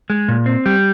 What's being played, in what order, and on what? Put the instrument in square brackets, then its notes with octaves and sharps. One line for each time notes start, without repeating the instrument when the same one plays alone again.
[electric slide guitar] G#3
A#2
C4
G3